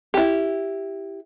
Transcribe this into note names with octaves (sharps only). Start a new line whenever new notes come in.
E4 G4